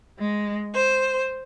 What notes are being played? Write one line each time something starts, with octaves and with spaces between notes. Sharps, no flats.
G#3
C5